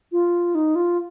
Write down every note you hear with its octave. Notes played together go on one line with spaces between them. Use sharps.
F4
D#4
F4